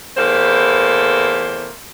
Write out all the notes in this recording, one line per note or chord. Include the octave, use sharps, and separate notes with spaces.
E2 A2 A#3 C5